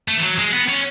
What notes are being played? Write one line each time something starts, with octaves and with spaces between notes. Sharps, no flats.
A3
E3
F#3
G#3
B3
C#4